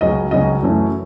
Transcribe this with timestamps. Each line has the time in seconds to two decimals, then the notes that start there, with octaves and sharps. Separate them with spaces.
0.01 C#2 C#3 F#3 C#4 D#5
0.31 C#2 C#3 F#3 C#4 D#5
0.62 F#2 E3 A3 C#4